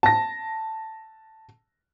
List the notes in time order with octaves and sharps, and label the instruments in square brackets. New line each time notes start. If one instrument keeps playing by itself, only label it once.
[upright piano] A5 A#6